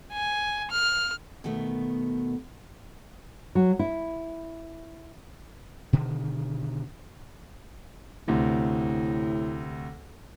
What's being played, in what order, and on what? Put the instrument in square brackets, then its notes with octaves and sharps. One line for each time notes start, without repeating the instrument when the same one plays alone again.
[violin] G#5
F6
[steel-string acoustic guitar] B2 D#3 A3 B3
[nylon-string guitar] F#3
E4
[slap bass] B2 D3 D#3
[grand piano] D2 C3 [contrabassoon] A2